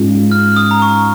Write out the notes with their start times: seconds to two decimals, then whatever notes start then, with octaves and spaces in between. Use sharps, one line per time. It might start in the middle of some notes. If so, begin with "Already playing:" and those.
Already playing: G#2 G#3 C#4 F4
0.31 F6
0.56 D#6
0.71 A#5
0.82 C#6